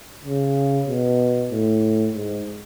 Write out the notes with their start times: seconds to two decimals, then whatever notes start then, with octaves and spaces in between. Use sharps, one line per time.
0.25 C#3
0.87 B2
1.51 A2
2.13 G#2